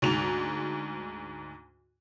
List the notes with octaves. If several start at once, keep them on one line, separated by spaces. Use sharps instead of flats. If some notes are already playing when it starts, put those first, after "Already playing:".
D2 G#2 F7